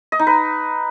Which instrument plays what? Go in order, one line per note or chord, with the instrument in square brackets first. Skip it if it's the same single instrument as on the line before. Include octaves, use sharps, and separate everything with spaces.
[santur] D#5
D#4
B4